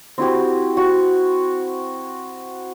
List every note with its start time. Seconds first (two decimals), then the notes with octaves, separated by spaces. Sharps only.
0.18 C4 E4 F#4 G4
0.77 F#4